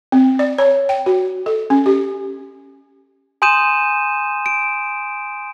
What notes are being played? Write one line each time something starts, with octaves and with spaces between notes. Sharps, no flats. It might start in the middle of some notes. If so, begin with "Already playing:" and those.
C4
D5
C#5
G5
F#4
A4
C#4
G4
G#5 C6 D#6 G6 D#7 E7
D7